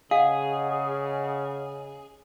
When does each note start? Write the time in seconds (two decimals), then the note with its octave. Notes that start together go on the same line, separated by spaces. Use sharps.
0.11 C#3 G#4 D#5 F5 F#5